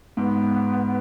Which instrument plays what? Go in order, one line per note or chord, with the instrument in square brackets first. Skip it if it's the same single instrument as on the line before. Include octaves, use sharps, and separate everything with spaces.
[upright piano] G#2 [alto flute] B3